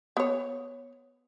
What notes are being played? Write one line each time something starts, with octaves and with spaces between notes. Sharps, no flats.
B3 C#5